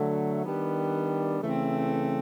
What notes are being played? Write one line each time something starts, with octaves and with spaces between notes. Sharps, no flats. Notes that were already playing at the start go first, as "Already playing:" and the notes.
Already playing: D3 F#3 A3
D#3 G3 B3 D4
C#3 E3 A3 C4